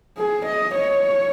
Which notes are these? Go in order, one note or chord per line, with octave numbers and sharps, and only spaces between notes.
G#4
D#5
C#5